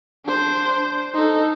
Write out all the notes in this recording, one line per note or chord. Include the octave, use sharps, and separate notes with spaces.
D4 C5
D#4 A4